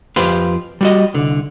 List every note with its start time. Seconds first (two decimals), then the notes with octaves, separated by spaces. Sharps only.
0.16 F2 F4 G4 B4 C5
0.81 G3 F#4 D#5
1.14 C2 D3